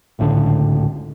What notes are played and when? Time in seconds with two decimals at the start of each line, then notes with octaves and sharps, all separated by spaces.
0.19 G#1 C#2 A2 D3